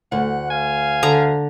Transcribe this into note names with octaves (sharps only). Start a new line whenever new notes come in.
D2 F#5
F5 G#5
D3 A#5